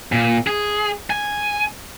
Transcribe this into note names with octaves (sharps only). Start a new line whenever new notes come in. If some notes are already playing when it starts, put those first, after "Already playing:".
A#2
G#4
G#5